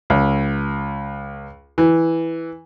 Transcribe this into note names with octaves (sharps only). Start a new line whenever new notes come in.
C#2
E3